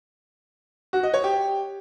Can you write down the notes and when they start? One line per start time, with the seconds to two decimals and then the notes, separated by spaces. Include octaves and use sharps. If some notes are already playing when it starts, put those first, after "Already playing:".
0.93 F#4
1.03 D#5
1.14 C#5
1.24 G4